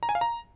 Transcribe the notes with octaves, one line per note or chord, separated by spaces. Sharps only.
A#5
G#5
F5
A#5